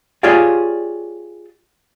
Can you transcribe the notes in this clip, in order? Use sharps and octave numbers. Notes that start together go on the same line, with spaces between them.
F4 G4 G#4 C#5 D5 F5